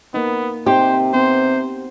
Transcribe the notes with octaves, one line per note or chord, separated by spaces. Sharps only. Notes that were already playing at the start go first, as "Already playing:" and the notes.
A#3 B3 D#4
C3 D#4 G4 C5
C3 B3 C4 C5